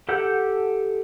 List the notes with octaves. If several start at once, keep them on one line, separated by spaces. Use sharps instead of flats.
G4 A4 F#5 G6